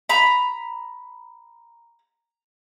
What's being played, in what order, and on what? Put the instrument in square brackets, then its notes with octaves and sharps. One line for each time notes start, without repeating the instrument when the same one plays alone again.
[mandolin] A#5 B5